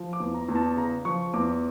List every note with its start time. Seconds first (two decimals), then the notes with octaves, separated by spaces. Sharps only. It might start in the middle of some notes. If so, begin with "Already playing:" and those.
Already playing: F3
0.13 D6
0.20 E2
0.34 A#5
0.49 E2
0.56 A5
0.77 C#3 A#5
1.05 F3 C#6
1.33 E2 D6